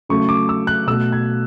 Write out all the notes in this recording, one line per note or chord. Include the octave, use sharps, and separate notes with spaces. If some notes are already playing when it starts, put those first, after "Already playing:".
C#3 F#3 A3 C#6
D6
E6
F#6
B2 A3 E6
G#6